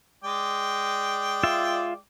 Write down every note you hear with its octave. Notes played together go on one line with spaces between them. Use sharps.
G#3 D5 G5
F4 E5